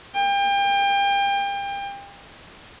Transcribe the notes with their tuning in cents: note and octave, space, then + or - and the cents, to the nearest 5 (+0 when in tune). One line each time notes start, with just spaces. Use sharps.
G5 +30